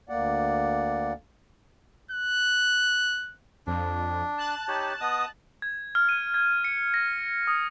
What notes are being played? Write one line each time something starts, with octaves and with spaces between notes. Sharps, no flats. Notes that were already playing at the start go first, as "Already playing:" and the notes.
D2 A#3 D5 F#5
F#6
F2 D4
A5 F#6
D#4 G4 C#5
B3 D#5 D#6
G#6
F6
D#7
G#6
C#7
A#6
D#6